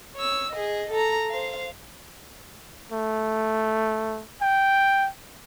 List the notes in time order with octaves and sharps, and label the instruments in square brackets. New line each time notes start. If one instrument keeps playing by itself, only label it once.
[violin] C#5 E6
G#4 D#5
A4 A#5
C5 F5
[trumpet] A3
G5